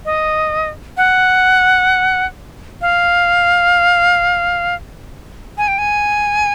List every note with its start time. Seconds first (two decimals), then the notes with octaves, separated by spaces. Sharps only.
0.05 D#5
0.97 F#5
2.81 F5
5.58 G#5
5.68 G5
5.78 G#5